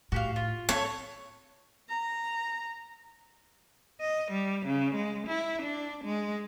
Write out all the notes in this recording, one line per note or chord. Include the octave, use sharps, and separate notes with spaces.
A2 F#4 G4 F5
F4
A3 C4 A4 C#5
A#5
D#5
G3
C#3
G#3
E4
D4
G#3